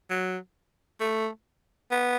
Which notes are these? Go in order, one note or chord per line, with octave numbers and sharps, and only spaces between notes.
F#3
A3
B3